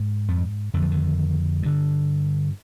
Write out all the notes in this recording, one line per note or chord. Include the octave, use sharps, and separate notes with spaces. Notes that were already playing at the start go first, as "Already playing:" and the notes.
Already playing: G#2
F2 F3
F2 D3 D#3
F3
D#3
G2 D3